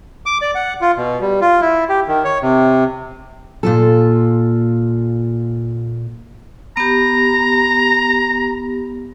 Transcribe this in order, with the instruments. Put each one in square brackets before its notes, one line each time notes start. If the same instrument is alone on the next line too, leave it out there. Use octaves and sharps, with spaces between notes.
[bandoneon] D6
D5
F#5
F4
B2
G3
F4
E4
G4
D#3
C#5
C3
[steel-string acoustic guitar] A#2 F4 A4
[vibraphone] B3 G4 [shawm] A#5